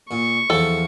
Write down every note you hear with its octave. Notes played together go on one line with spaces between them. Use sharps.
A#2 C#6
E2 F3 A4